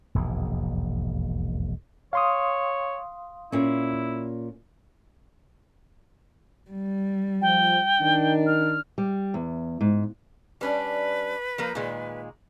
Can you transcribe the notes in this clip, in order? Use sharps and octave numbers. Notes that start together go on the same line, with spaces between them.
E1 A#1 D#2 G#2
C#5 F5 C6 D#6
A#2 C#4 E4
G3
F3 G5
D#3 D4
F6
G3
E2
G#2
G3 C#4 D4 B4
F3 A#3 A#4
A#2 D#3 G#3